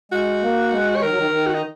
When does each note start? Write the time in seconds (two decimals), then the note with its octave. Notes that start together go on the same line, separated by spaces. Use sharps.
0.12 G#3 F#4
0.43 A#3
0.71 G#3
0.96 C#5
1.02 D#3 A#4
1.10 F#3
1.18 D#3
1.31 D#3
1.46 F#4
1.54 D#4